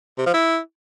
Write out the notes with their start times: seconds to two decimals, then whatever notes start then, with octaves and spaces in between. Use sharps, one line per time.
0.18 C3
0.26 F3
0.34 E4